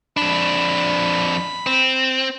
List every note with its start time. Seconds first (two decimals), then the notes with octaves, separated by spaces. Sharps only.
0.17 F2 D4 B5
1.67 C4